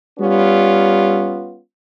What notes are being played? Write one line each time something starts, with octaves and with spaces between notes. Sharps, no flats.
G3 B3 C#4 F4